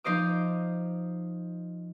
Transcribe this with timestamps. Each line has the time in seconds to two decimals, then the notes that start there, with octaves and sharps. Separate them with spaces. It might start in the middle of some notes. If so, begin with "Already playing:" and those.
0.04 F3 D#4 C5 D#5 D6